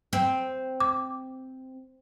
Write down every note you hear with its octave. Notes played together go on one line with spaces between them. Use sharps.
C4
D6